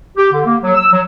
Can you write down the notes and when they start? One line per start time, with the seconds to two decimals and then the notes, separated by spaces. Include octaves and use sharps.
0.17 G4
0.33 D3
0.46 A#3
0.63 F#3
0.75 E6
0.92 F#3